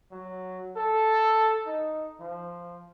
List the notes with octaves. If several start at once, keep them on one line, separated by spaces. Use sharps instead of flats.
F#3
A4
D#4
F3